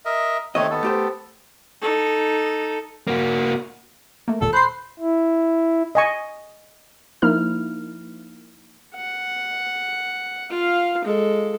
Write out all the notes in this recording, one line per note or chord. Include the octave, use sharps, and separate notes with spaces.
A#4 D#5 E5
D#2 A3 C4 C#5 D#5
B3 A4
A3 G4 C5
D#4 A4
A#3 F#4
A3 A#3
G#1 D#2 A#2 A4
C5 B5 C6 F#6 C7
E4
D#5 G#5 C#6
F3 A#3 D#4 E4 F6
F#5
F4 F5
G#3 A4